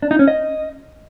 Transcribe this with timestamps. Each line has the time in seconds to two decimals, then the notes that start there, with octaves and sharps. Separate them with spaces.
0.02 D4
0.11 D#4
0.19 C#4
0.28 D#5